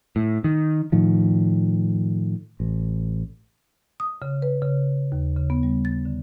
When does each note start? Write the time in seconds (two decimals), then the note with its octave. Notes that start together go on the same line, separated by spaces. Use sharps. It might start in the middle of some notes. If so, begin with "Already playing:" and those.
0.16 A2
0.44 D#3
0.92 A2 D#3 F3
2.60 A1
4.00 D#6
4.22 C#3
4.42 B4
4.62 C#3
5.12 D#2
5.36 C#3
5.50 B3
5.63 G3
5.85 A6
6.05 D3